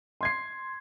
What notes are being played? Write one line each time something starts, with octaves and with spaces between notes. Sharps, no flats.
C6 G#6 C7